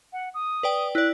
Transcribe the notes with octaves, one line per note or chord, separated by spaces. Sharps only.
F#5
D#6
B4 D5 G5
E4 D5 F#6